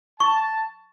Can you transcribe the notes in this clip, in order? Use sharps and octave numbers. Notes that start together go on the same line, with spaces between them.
A5 C#6